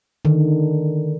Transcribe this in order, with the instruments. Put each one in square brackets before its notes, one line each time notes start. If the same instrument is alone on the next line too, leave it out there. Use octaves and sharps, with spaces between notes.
[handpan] D3 D#3